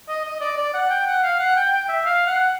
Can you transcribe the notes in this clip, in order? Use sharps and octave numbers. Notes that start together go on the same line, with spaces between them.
D#5
D#5
D5
D5
F#5
G5
F#5
F5
F#5
G5
G5
E5
F5
F#5